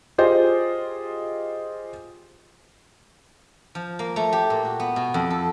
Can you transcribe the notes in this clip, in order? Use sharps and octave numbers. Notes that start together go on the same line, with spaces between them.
F4 G4 G#4 C5 D#5
F3
A#3
A3
G4
A#2
F#4
B3
B2
F2
A4